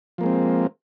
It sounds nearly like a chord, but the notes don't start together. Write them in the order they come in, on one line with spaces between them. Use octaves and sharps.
F3 A#3 G#3 C4